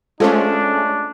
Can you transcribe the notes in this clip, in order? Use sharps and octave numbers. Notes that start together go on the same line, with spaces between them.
G#3 A3 C#4 D4 F4 A4 C5